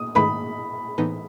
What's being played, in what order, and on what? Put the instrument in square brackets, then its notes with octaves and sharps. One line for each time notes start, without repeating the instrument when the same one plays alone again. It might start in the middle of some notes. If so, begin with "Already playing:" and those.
Already playing: [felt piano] D#6
[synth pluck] G#2 D#3 A3 E4 B4 [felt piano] B5
[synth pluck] A2 E3 B3 D#4